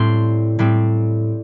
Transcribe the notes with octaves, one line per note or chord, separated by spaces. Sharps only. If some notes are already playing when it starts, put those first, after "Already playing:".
Already playing: A2 G3 C4 C6
A2 G3 C4